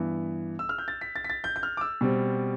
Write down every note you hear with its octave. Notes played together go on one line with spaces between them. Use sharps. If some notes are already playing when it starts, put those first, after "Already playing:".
Already playing: G2 E3 B3
E6
F6
G6
A6
B6
A6
B6
A6
G6
G6
F6
D6
E6
B2 G3 C4